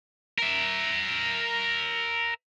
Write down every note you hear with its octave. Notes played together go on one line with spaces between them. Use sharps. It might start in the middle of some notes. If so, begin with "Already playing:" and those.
A#4 E5